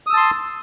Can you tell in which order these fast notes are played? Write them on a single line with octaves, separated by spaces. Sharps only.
D#6 E6 A5 C6